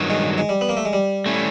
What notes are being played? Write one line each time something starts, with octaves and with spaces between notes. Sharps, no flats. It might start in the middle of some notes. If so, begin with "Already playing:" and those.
Already playing: G2 D#3 F#3
G#3
G#3
G3
B3
A#3
A3
G#3
G3
A3 C#4 E4